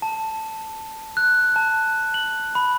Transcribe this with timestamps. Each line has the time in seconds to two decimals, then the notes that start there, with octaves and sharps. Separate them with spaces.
0.02 A5
1.17 F#6
1.56 A5
2.14 F#7
2.55 B5